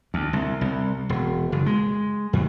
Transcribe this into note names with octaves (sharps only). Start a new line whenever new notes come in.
D2
C2
C2
E1
F#1
G#3
F2